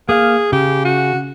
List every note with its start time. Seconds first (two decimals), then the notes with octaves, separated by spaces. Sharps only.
0.09 A#3 G#4 F5
0.52 C#3 G4
0.85 F#4